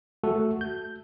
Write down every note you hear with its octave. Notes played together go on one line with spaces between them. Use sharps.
A3 F#4 A4
G6